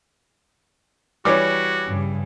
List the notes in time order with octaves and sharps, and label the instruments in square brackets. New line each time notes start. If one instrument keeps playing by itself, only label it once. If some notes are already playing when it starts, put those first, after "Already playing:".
[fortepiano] E3 G3 [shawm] F#4 [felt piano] C#5 D6
[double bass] G2 C#3